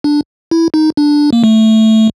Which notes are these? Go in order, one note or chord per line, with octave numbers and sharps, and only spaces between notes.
D4
E4
D#4
D4
A#3
A3